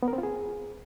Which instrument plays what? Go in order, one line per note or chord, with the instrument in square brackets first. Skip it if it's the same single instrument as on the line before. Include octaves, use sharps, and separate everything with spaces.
[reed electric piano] B3
A#4
C4
F4
G#4